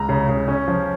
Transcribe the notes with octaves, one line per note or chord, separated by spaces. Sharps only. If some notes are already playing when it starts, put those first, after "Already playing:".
Already playing: C#2 A#5
C#3
C#3
C#4
F3